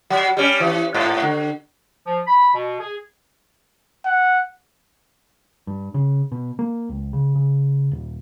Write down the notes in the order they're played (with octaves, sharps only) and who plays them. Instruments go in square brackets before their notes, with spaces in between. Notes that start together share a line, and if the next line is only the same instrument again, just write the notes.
[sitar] F#3
G3 C#4
E3
G#2
D3
[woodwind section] F3
B5
B2
G#4
[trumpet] F#5
[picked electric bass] G2
C#3
B2
A#3
C#2
C#3
C#3
D#1